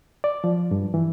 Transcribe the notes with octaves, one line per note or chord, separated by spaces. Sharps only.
D5
F3
G2
E3